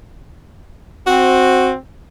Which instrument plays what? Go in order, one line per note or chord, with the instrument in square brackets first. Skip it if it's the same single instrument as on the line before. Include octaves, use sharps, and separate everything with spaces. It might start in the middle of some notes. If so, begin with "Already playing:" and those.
[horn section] C4 [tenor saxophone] F#4